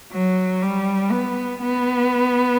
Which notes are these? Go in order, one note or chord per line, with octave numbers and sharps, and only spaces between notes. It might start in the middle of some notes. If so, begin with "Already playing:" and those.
F#3
G3
B3
B3